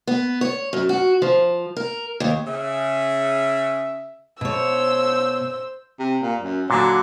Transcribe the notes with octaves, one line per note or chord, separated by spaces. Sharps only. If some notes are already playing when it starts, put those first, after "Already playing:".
B3
C#5
F#2
F#4
F3
A#4
D#2
C#3 E5
B2 C5 C#5 E6
C3
A#2
F#2
A#2 D3 F#3